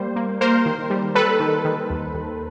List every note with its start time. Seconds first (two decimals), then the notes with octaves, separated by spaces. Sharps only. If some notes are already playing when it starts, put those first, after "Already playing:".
Already playing: G3 A#3 C5
0.16 A#3
0.41 A#3 A#4 C5
0.66 D#3
0.90 G3
1.15 G3 A4 B4
1.40 D#3
1.65 D#3
1.90 D#2
2.14 D#2